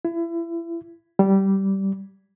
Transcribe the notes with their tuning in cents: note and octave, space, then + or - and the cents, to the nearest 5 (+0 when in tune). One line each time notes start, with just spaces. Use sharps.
E4 +30
G3 -15